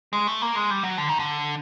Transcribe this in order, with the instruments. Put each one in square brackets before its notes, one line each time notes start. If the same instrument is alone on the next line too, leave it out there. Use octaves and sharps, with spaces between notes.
[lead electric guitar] G#3
A3
A#3
G#3
G3
F#3
D3
D#3
D3